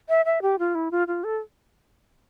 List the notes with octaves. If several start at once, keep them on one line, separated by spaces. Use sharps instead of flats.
E5
E5
G4
F4
E4
F4
F4
A4